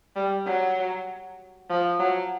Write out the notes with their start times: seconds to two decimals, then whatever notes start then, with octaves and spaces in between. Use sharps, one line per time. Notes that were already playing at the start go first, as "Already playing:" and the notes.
0.16 G3
0.46 F#3
1.69 F3
2.00 F#3